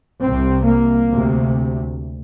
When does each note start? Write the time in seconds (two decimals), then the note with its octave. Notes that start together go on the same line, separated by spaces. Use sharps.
0.22 C2 C3 C4
0.65 A#3
1.09 D2 C3